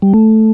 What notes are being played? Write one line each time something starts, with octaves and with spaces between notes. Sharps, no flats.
G3
A3